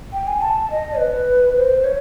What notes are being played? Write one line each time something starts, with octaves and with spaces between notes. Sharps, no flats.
G5
G#5
A5
D#5
B4
C5
C#5